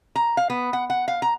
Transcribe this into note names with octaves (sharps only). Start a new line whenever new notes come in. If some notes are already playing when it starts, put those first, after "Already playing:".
A#5
F5
B3
F#5
F#5
F5
A#5